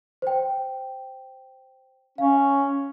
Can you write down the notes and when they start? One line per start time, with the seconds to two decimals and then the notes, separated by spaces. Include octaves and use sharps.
0.22 C5 G5
2.18 C#4 F5